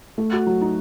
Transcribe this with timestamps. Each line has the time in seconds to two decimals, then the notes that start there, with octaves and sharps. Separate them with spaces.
0.18 A3
0.33 F#4
0.47 F#3
0.61 D#4